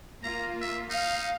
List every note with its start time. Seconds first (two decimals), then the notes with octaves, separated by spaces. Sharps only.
0.23 A#3 F4 A#5
0.61 E5
0.90 D#4 F5